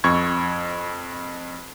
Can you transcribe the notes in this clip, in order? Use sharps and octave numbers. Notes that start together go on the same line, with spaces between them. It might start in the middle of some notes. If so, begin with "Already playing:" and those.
F2 C#6 G#6